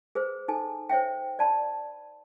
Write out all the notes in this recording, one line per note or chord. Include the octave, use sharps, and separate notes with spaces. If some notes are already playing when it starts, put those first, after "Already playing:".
G#4 B4 C5
D#4 A4 G#5
C5 C#5 E5 G5
D5 A5 B5